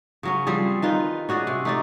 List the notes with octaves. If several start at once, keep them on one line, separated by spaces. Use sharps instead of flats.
C#3 F#3 C#4
F3 G3 C4 G#4
D#3 D#4 F4 B4
C#4 F#4 G#4 D5
C3
A3 D#4 D5